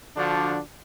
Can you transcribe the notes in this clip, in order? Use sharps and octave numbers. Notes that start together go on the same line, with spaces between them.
D3 F3 D4 F#4